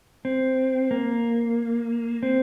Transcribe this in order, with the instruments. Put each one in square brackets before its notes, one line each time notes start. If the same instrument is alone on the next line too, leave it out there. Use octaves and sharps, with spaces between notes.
[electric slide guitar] C4
A#3
C4